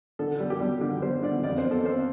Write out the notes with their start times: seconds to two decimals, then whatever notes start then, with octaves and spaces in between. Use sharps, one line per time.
0.19 D3 A4
0.40 G3
0.50 G4
0.60 G3
0.81 D3 G4
1.02 G3 C5
1.23 D3 D5
1.43 F2 D5
1.58 C5
1.64 F2
1.71 A4
1.85 F2 C5